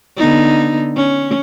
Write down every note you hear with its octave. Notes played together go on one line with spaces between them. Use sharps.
D3 B3 D#4
C#4